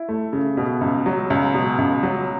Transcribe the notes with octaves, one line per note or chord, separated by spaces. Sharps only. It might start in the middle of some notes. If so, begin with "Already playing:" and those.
Already playing: E4
A3
C#3
B2
C#2
F#3
C#2
B2
C#2
F#3